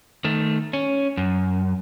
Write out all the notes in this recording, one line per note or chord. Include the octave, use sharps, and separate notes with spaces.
D#3 A3
C#4
F#2